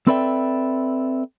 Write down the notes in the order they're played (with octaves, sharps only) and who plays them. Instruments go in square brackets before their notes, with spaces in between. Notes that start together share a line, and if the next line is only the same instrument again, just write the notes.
[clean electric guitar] C4 A4 B4 D5 E5 G5